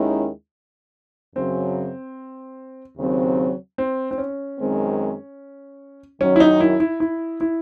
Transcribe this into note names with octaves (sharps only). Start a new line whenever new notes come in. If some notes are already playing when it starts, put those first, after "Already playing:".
Already playing: D#2 D#3 G#3 C#4 E4
F#2 C#3 F#3 C4
D#2 C#3 F#3 C4
C4
C4
C#4
F#2 D#3 G#3 C4
F#2 D#3 F#3 C#4
E4
D#4
E4
E4
E4
E4